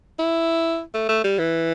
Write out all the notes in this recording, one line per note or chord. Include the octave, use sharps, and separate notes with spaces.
E4
A3
A3
G3
E3